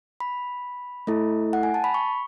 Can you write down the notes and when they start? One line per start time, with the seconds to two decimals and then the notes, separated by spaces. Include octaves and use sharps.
0.20 B5
1.07 A3 E4 A4
1.53 F#5
1.63 G#5
1.74 A5
1.84 B5
1.94 C#6